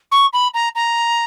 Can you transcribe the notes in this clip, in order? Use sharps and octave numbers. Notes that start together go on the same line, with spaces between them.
C#6
B5
A#5
A#5